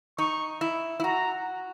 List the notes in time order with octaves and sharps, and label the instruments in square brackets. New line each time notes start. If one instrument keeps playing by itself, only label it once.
[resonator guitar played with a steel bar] D#4 [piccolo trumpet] C#6
[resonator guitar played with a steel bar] E4
E4
[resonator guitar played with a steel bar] F#4 [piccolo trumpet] A#5